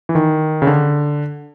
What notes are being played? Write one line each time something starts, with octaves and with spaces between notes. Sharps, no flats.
E3
D#3
C#3
D3